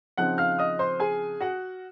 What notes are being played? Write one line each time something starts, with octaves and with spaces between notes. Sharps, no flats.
C#3 F3 C4 D#4 F#5 F#6
F5 F6
D#5 D#6
C5 C6
G#4 G#5
F#4 F#5